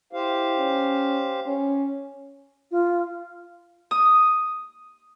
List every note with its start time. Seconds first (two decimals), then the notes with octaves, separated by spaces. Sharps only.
0.13 E4 G4 C5 F5
0.57 C#4
1.47 C#4
2.71 F4
3.91 D#6